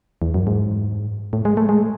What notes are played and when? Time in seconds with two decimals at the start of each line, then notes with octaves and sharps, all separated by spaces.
0.22 E2
0.34 F#2
0.47 G#2
1.33 A2
1.45 G#3
1.57 A3
1.69 G#3